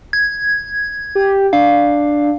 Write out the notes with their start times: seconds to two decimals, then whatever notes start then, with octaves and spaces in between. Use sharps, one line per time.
0.13 G#6
1.15 G4
1.53 D4 F5